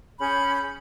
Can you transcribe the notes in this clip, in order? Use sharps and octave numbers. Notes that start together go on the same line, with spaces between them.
C#4 G#4 B5 G6